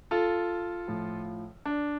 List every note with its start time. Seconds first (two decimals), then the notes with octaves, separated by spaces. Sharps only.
0.11 F4 A4
0.88 A2 F3
1.66 D4